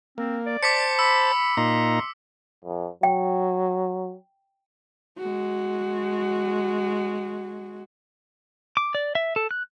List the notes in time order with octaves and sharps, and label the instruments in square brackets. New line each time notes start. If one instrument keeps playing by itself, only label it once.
[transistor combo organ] A#3 [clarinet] C4
[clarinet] D5
[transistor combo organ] C5 A5 [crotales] D6 B6 C#7
[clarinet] B5 [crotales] E6
[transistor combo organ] A#2 D#4 A#5 [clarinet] C6
[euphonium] F2
[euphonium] F#3 [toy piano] G5
[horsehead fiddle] G#3 F#4
[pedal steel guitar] D6
D5
E5
A4
F#6